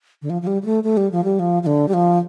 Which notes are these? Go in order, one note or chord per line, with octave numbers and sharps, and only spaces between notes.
D3
F3
F3
G3
G3
A3
A3
G3
F3
G3
F3
F3
D3
G3
F3